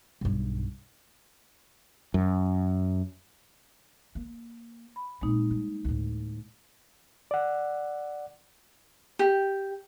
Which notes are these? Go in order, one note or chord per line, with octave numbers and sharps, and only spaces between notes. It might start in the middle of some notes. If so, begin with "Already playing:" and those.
B1 G2
F#2
A#3
B5
A#2 G#3 A#3 C4 D#4
G3
D2 A2
D5 F#5
G4